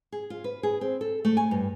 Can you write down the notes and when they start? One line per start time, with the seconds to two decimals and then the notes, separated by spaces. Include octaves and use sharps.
0.12 G#4
0.30 F4
0.44 B4
0.63 G#4
0.81 C4
1.01 A4
1.25 A3
1.37 G#5
1.51 G2